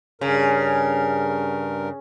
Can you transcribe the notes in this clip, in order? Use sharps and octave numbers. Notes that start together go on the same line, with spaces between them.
G2 C#3 A#4